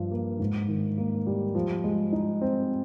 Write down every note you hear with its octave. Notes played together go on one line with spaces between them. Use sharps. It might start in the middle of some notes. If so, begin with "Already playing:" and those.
Already playing: G2 F3 F4
A#3
G#2
D#3
A#3
G3
F3
G#3
D#4
C4